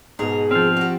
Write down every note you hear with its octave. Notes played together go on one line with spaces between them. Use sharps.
G#2 B2 G#4 A#5
F3 C4 F6
F#4 G4